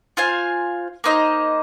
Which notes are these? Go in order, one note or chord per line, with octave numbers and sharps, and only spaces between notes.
F4 C5 F5 G#5
A#3 D#4 C5 D#5